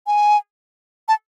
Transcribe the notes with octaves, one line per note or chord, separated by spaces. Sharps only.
G#5
A5